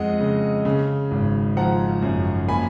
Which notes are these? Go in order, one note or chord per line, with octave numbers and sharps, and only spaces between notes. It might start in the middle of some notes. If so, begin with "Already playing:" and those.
Already playing: F2 G#3 D#5 F#5
C#3
C#3
G#1
F3 F#5 A#5
F#2
A#3 G#5 B5